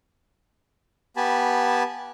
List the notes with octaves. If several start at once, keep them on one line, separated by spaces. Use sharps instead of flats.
B3 G4 G#5 A5 B5